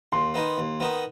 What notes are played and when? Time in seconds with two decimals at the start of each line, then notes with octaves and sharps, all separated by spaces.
0.12 D#2 C6
0.34 D#3 B3 D#4
0.58 D#2
0.80 D#3 B3 D#4